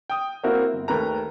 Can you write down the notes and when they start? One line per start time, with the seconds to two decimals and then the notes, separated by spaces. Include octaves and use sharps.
0.10 G5 D#6
0.43 A#3 C4 E4 F#4 A#4
0.74 G1
0.88 D#2 A3 A#4 B4 A#5